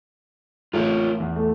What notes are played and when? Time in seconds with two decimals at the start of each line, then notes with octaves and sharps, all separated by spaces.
0.73 A1 F4 A#4 C#5
1.20 E2
1.36 A3